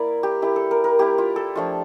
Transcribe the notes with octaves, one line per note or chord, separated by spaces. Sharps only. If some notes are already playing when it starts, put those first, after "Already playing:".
Already playing: A#3 E4 A#4 D5
G4
A#3 E4 G4
A4
A#4
A#4
A#3 E4 G4
F4
A4
F3 A3 D4 F4